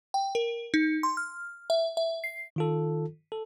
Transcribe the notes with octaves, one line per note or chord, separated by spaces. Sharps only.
G5
A#4
D#4
C6
F6
E5
E5
C7
D#3 F4 A4
A4